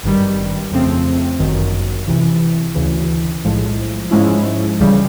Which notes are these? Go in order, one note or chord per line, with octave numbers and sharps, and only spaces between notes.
G#1 G2 D#3 G3
F2 C#3 F3 A3 C4
G1 F#2 D#3
C#2 C3 E3
D2 C#3 E3
B1 A2 F3 G#3
G#2 F3 G#3 C#4 E4
C#2 C#3 E3 G3